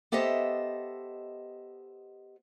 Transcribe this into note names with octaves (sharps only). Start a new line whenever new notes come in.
B3 G4 A4 C5 D#5 E5